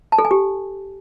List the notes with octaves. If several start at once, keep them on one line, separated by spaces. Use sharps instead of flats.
A5
A4
G#5
G4